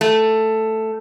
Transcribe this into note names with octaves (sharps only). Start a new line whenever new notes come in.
A3